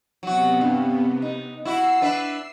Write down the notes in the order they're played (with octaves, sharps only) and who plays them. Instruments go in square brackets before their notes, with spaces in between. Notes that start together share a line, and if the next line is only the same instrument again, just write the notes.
[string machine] C3 B3 [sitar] F#3 F#4
[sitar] G2
D#4
[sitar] E4 F#4 [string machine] E6 C7
[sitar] D4 B4 E5